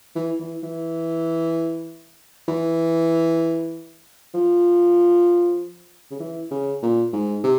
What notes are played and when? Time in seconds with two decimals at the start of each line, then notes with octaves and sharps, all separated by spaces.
0.16 E3
0.40 E3
0.63 E3
2.48 E3
4.34 F3
6.11 C#3
6.20 E3
6.51 C#3
6.82 A#2
7.13 G#2
7.44 C3